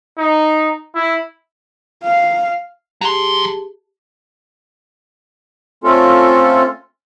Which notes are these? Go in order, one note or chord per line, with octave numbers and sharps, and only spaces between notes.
D#4
E4
F5
F#3 G4 G#4 A5 C6
A3 C4 C#4 F4 A4